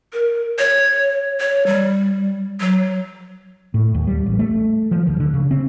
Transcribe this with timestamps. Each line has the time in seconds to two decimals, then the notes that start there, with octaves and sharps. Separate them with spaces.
0.13 A#4
0.59 C#5
1.40 C#5
1.66 G3
2.60 F#3
3.74 A2
3.94 D#2
4.07 G3
4.26 A1
4.39 A3
4.91 F3
5.07 D2
5.20 D3
5.34 C#3
5.51 C4